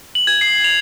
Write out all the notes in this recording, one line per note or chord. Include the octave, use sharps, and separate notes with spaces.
F#7
G#6
C7
F7